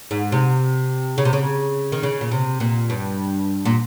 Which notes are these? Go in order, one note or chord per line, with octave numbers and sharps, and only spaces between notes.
G#2
C3
C#3
C3
C#3
D#3
C#3
A#2
C3
A#2
G2
A#2